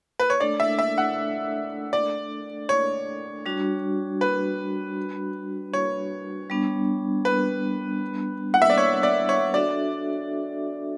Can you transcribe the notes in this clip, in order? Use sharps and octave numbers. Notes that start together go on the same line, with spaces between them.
B4
C#5
A3 D4 A4 D5
E5
E5
F#5
D5
C#5
G3 D4 F#4
B4
C#5
G3 B3 D4
B4
F#5
E5
D5
C#5
D5
C#5
D4 F#4 A4 D5 E5